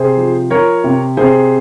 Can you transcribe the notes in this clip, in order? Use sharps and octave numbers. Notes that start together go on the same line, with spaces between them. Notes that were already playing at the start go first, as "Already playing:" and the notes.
Already playing: C3 G#4 C5
F3
F3 A#4 C#5
C3
C3 G#4 C5